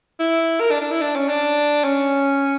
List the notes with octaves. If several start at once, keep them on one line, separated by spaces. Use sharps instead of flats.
E4
A#4
D4
D4
E4
D4
C#4
D4
C#4